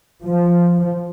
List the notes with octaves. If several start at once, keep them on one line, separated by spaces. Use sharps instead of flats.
F3